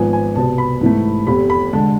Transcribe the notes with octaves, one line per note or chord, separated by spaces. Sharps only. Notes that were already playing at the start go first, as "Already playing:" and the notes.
Already playing: G#1 G#2 F3 B3 G#5
G#5
C2 B2 B3 A5
B5
G#2 E3 A3
F1 E2 C3 B5
B5
D3 G#3 A5